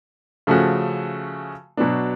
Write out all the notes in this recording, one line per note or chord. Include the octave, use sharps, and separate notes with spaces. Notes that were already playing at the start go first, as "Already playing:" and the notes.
C#3 F3 A3 C#4 F#4
B2 F#3 B3 D4